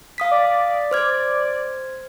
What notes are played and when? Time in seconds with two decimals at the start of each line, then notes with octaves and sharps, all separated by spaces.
0.18 F5 D#6 B6
0.31 D5
0.91 C5 F6 G#6